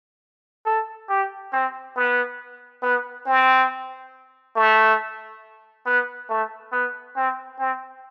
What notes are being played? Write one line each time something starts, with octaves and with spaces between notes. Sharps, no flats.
A4
G4
C4
B3
B3
C4
A3
B3
A3
B3
C4
C4